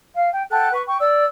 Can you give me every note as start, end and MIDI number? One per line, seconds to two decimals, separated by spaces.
0.15 0.29 77
0.31 0.44 79
0.50 0.70 69
0.50 0.70 78
0.50 0.70 79
0.50 0.70 90
0.73 0.82 71
0.73 0.82 85
0.86 0.97 79
0.86 0.97 85
1.00 1.24 74
1.00 1.24 88